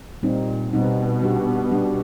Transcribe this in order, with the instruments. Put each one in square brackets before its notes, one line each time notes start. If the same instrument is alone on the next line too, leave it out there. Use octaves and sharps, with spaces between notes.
[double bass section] A#2 [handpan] G3 C4 D#4
[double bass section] B2 [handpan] G3 C4 D#4
[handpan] G3 B3 D4 G4
G3 B3 D4 G4